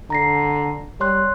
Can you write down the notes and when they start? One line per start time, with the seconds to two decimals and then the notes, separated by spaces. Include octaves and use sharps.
0.10 D3 A#5 A#6 C7
1.00 G3 C#5 C6 F#6